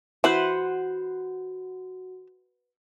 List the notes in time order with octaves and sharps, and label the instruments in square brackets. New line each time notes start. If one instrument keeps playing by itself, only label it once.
[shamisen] E3 E4 [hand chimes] F#4 [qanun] B4 C5 F#5